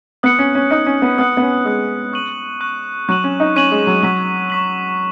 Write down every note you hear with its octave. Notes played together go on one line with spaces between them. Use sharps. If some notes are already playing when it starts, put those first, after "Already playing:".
B3 D#6 F#6 C#7
C#4
C#4
D#4 D#6 F#6 C#7
C#4
B3
B3 D#6 F#6 C#7
B3
C#4
G#3 D#6 F#6 C#7
C#6 F#6 D#7 F#7
C#6 F#6 D#7 F#7
F#3 C#6 F#6 D#7 F#7
C#4
D#4
C#4 C#6 F#6 D#7 F#7
G#3
F#3
F#3 C#6 B6 F#7
C#6 B6 F#7